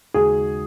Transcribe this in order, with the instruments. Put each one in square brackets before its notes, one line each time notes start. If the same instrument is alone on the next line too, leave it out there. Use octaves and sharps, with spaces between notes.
[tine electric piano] D#2 C#3 G#3 D#4 F#4 [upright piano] G#4